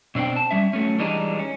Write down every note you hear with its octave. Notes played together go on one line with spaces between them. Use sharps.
B2 C4 D4 C5 G5
A5
G3 C#4 E5
F#3 A3 C#4
E3 G3 G#3 D4 D#4
C#4